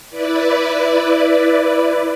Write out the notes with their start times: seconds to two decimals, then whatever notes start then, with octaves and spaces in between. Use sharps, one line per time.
0.10 E4 B4 D5